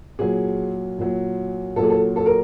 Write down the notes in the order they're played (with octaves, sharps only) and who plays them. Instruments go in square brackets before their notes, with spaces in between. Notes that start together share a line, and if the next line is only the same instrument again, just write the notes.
[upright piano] A#2 F#3 G#4
A#2 F#3
A#2 F#3 A4
G#4
A4
A4
A#4